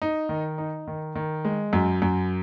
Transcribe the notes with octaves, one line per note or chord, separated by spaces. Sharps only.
D#4
D#3
D#4
D#3
D#3
G#3
F#2
F#2